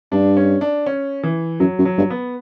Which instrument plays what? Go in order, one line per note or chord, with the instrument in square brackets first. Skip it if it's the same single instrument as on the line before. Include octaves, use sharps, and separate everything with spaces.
[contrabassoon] G2 [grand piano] D4
[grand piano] C#4
D4
C#4
E3
[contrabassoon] F#2 [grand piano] F#3
[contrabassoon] F#2
[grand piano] F#3
[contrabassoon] G2
[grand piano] B3